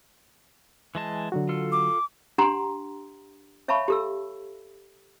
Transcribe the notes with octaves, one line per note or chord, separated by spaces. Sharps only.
E3 G#3 A5
D3 F#3 F#4
F4 A4
D6
D4 G4 F#5 G#5 A#5 C6
C#5 E5 F5 A5 B5 C#6
G4 A4 E6